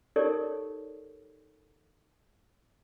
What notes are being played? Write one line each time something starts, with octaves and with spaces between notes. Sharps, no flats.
D#4 G4 A4 A#4 C#5 D5